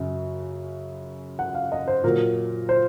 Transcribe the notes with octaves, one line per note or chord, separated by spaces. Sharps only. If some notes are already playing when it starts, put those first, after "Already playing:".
Already playing: F#2 C#3 F#3
F#5
F5
D#5
C5
A#2 F#3 A#4
C5